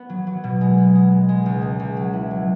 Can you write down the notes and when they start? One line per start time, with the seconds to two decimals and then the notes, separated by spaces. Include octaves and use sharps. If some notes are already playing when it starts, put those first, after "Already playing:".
Already playing: B3
0.09 F#3
0.27 F#3
0.44 B2
0.61 G#3
0.78 B3
0.95 G#3
1.12 G#3
1.29 G#3
1.46 C#2
1.62 G#3
1.79 C#2
1.97 F#3
2.13 E4
2.31 F#3